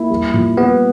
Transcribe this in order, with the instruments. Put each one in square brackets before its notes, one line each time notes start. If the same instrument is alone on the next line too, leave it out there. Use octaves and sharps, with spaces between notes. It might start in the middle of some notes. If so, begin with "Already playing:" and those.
Already playing: [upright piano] A#3 [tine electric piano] E4
[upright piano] G3
A#2
[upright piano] G3 [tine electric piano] B3